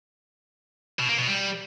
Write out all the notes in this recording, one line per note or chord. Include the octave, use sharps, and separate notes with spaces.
B2
A#3
B2
G3